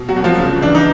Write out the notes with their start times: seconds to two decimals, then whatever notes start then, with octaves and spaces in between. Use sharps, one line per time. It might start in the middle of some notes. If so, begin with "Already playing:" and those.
Already playing: B2
0.09 F#3 F#4
0.16 C2
0.24 F3 F4
0.39 C#3
0.62 E3 D4
0.75 D#4